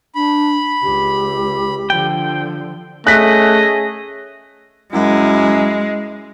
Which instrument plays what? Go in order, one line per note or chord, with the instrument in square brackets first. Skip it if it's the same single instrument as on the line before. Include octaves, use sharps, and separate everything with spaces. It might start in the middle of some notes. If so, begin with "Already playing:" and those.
[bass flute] D4 [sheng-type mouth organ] B5
[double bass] C#2 [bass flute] G4
[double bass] D3 F3 [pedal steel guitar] G5
[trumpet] A3 [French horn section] C#4 G#4 [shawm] D#5 [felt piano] F#6 B6
[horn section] F#2 E4 [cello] G#3